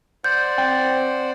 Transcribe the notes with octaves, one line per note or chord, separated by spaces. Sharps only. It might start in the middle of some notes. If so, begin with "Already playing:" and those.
C5 D5 F#5 G6
C4 G5